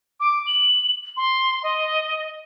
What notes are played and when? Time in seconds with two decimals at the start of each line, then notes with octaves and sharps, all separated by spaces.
0.20 D6
0.47 F#7
1.17 C6
1.63 D#5